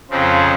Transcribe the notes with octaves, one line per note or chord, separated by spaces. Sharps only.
F2 C#3 F3 C4